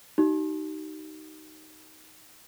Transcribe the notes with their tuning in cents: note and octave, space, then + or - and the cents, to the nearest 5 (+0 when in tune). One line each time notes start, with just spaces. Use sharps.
D#4 +0 G4 -40